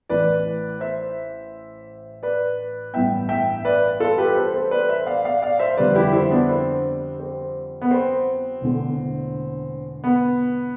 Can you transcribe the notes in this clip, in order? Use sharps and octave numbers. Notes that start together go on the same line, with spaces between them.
A1 A2 E3 B4 D5
C5 E5
B4 D5
A1 G2 E3 B3 E5 G5
E5 G5
B4 D5
F4 A4
G4 B4
A4 C5
A4 C5
B4 D5
C5 E5
D5 F5
D5 F5
D5 F5
C5 E5
F2 D3 G3 B4 D5
E4 G4
C4 E4
B3 D4
C4
C4
B3
C4
E1 E2 D3 A3
B3